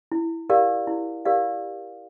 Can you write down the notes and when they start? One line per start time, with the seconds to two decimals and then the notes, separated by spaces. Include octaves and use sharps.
0.12 E4
0.49 G4 A#4 D5 F5
0.87 E4
1.25 G4 A#4 D5 F5